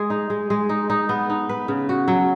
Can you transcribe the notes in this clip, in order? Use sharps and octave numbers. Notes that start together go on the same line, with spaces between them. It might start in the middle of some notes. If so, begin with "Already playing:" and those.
Already playing: G#3 G#4
D#4
G#3
G#3
D#4
D#4
B3
D#4
B4
C#3
F#4
F#3